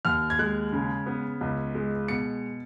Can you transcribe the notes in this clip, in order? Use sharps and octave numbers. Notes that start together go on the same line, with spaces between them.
D#2 F6
G#6
G#3 F#6
C#3
B3
C#2
G#3
B2 C#7